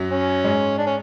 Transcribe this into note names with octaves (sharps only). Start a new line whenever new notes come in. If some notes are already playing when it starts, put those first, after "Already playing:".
Already playing: F#2 F#3
C#4
G#2 G#3
D4
C#4